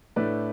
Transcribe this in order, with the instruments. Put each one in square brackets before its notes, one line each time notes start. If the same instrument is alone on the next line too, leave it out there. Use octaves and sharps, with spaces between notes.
[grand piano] A2 A3 D4 B4 D5